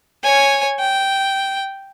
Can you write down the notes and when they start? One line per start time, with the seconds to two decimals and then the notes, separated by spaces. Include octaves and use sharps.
0.24 C#5 G#5
0.79 G5